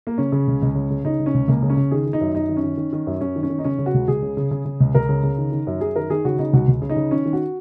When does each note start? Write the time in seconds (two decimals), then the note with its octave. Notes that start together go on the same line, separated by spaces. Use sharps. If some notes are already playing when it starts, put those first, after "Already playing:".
0.07 A#3
0.18 C#3 C#4
0.32 C#3
0.47 C#2
0.62 C#2
0.75 C#3
0.90 C#3
1.05 C#3 D#4
1.19 C#3
1.26 C#4
1.34 C#2
1.48 C#2 A#3
1.63 C#3
1.70 C#4
1.77 C#3
1.91 D#3 G#4
2.06 D#3
2.13 D#4
2.21 F#2
2.35 F#2 D#4
2.49 D#3
2.56 C#4
2.64 D#3
2.77 D#3
2.93 D#3
3.07 F#2
3.21 F#2 C#4
3.36 D#3
3.43 C#4
3.50 D#3
3.59 D#4
3.64 C#3 C#4
3.78 C#3
3.86 F#4
3.94 C#2
4.08 C#2 G#4
4.23 C#3
4.37 C#3
4.51 C#3
4.65 C#3
4.80 C#2
4.95 C#2 A#4
5.09 C#3
5.23 C#3
5.38 D#3
5.52 D#3
5.67 F#2
5.81 F#2 G#4
5.96 D#3 A#4
6.10 D#3 G#4
6.25 C#3 F#4
6.39 C#3 D#4
6.53 C#2 F#4
6.68 C#2
6.82 C#3
6.89 D#4
6.96 C#3
7.11 D#3 C#4
7.26 D#3
7.33 F#4